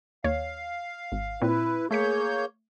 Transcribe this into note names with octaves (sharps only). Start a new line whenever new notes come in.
D#2 C#5 F5
G#1
A#2 C4 E4 B4
A3 A#3 G#4 C#5 G6 B6 C#7